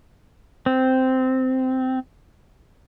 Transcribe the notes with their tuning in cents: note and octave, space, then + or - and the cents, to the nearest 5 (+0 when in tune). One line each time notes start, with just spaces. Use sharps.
C4 -10